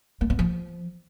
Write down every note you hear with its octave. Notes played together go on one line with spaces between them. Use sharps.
A#3
B3
F3